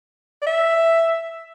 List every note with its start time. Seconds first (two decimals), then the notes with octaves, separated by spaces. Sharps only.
0.42 D5
0.47 E5